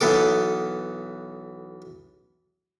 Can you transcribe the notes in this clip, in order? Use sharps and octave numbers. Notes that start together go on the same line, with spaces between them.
B1 E3 B3 A4 D6